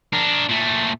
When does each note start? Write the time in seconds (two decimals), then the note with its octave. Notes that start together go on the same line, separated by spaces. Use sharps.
0.13 D4 A#4
0.49 A#2 A3